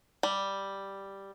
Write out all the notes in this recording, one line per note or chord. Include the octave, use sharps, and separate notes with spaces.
G3